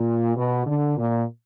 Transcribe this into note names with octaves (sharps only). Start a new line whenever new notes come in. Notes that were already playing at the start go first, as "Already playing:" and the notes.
Already playing: A#2
B2
D3
A#2